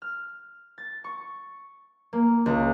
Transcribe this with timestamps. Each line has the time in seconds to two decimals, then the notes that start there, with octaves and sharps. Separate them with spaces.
0.02 F6
0.78 A6
1.04 C#6
2.13 A#3
2.46 C#2